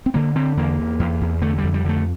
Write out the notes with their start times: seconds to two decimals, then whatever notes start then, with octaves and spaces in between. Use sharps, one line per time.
0.06 C4
0.14 D3 A#3
0.35 D3 C4
0.57 E2 A#3
0.79 E2
0.99 E2
1.21 E2
1.42 D3 A3
1.58 G3
1.64 F2
1.74 G3
1.85 D3 A3